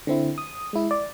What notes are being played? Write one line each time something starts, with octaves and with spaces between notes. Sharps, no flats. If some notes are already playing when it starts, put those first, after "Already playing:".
D3 C4 E4
D#6
G#3 E4
D5